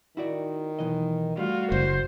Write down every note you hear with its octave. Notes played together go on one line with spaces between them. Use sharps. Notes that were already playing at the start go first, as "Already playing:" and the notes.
D#3 E4 F#4 D5
B1 E3 D#5
G3 A3 F4 F#4
F#1 C5